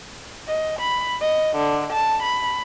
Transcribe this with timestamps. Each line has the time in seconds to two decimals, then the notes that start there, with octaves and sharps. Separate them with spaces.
0.48 D#5
0.80 B5
1.21 D#5
1.56 D3
1.93 A5
2.23 B5